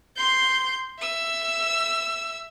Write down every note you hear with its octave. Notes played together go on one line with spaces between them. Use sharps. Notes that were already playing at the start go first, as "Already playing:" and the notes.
C6 G6
E5 E6